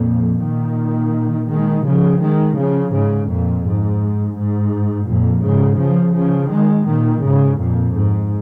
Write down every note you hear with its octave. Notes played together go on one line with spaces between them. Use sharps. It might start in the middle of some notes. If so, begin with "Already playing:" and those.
Already playing: F2 A#2
A#2 D#3
D#3 G#3
C#3 F3
D#3 G#3
C#3 F3
G#2 C#3
F2 A#2
G#2
G#2
F2 A#2
G#2 C#3
C#3 F3
C#3 F3
D#3 G#3
A#2 D#3
G#2 C#3
F2 A#2
G#2